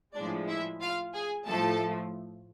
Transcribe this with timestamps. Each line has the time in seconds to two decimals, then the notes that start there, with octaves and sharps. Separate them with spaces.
0.15 A2 F3 G#3 D4 D5
0.48 E4 E5
0.82 F4 F5
1.14 G#4 G#5
1.47 A2 F3 A3 A4 A5